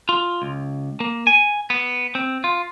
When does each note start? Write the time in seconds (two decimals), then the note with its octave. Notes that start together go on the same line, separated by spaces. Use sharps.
0.09 F4
0.42 C#2
1.00 A#3
1.27 G#5
1.70 B3
2.15 C4
2.44 F4